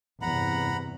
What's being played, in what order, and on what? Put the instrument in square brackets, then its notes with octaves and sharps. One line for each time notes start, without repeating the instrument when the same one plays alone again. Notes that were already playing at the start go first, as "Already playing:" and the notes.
[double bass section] E2 G2 C3 [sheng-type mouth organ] F#5 A#5 B5